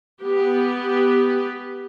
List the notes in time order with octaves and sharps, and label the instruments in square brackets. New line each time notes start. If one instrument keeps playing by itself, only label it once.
[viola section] B3 G4